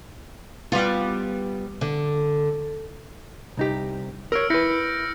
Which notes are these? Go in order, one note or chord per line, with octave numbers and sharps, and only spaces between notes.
G3 B3 F4
D3
C2 D#4 G4
A#4 C#5 E6 F6 D7
E4 B4 G6 A#6 C#7